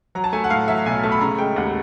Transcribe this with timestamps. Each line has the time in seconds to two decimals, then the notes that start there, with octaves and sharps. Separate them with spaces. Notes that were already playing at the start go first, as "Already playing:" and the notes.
0.15 F#3 A#5
0.24 A5
0.33 A3 G#5
0.44 F#5
0.50 A2 F5
0.68 F#3 E5
0.85 B1 G#5
1.03 A3 A5
1.12 B5
1.21 C#3 A#5
1.39 G#3 G5
1.56 D#2 F#5